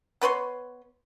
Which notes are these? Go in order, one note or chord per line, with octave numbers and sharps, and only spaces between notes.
B3 B4 C#5 C6